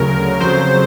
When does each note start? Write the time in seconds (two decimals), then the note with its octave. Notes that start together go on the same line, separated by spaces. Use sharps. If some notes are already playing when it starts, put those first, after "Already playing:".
Already playing: D2 C#3 F#3 A#4
0.41 F2 C#3 F#3 C5